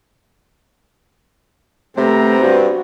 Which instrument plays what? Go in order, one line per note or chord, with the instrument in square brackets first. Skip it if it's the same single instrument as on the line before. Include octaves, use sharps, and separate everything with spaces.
[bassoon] C3 [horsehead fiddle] A3 A#5 [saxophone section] B3 C4
[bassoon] G2 [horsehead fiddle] F#4